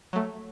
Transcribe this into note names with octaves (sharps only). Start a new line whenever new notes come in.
F#3 A3